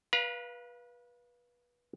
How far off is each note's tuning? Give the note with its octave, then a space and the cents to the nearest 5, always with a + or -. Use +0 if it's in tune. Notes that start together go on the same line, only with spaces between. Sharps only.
B4 -25 F5 +0 A#5 +45